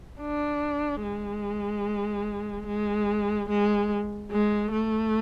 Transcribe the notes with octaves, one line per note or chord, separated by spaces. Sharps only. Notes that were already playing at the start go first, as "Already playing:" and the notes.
D4
G#3
G#3
G#3
G#3
A3